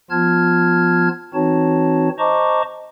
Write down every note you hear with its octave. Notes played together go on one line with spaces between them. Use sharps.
F3 B3 F4 A5 F6 G#6
E3 C4 D#4 F#4 C#5 A5
C5 D#5 A5 A#5 C#6 D6